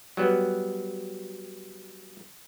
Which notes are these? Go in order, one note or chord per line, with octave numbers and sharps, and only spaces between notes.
F#3 G3 B3